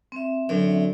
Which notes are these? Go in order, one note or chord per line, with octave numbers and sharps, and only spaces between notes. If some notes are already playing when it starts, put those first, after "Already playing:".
C4 E5
F#2 D3